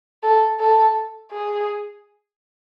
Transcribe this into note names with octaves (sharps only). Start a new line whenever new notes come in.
A4
A4
G#4